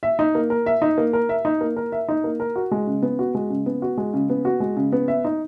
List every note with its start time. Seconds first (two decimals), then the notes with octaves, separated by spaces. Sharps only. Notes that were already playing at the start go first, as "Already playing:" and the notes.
0.03 E5
0.19 D#4
0.35 A#3
0.50 A#4
0.66 E5
0.82 D#4
0.98 A#3
1.13 A#4
1.29 E5
1.45 D#4
1.61 A#3
1.77 A#4
1.92 E5
2.08 D#4
2.24 A#3
2.40 A#4
2.56 F#4
2.72 G#3
2.87 C#3
3.02 B3
3.19 F#4
3.35 G#3
3.50 C#3
3.66 B3
3.82 F#4
3.98 G#3
4.14 C#3
4.30 B3
4.45 F#4
4.60 G#3
4.77 C#3
4.93 B3
5.08 E5
5.25 D#4